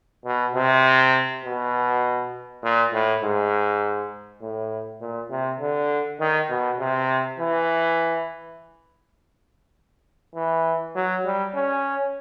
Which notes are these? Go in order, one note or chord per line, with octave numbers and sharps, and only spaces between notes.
B2
C3
B2
A#2
A2
G#2
A2
A#2
C3
D3
D#3
B2
C3
E3
E3
F#3
G3
C#4